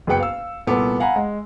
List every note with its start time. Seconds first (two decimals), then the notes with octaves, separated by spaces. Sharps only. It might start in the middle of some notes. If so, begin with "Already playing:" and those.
0.07 F#1 B3 G#4 B4 G5 C#7
0.20 F5 E6
0.67 C2 A#2 B3 A4 D6
1.00 F5 F#5 G#5 A#5 B5
1.16 G#3